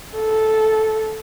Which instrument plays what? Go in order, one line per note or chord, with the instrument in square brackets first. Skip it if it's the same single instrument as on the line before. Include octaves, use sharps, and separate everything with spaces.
[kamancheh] A4